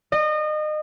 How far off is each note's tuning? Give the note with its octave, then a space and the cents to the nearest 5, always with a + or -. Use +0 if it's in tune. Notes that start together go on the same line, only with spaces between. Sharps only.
D#5 -30